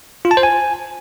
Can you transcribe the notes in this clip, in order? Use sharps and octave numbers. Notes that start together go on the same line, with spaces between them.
F4
A5
C5
G#5